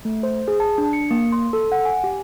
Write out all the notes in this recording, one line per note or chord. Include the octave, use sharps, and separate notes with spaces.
A3
C5
G#4
A5
D4
C#7
A#3
C6
A4
F#5
G#5
G4